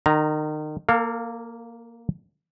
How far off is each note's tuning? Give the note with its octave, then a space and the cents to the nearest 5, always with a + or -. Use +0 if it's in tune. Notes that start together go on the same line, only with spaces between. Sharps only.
D#3 -30 A#5 +0
A#3 +0 A4 +45 F5 +10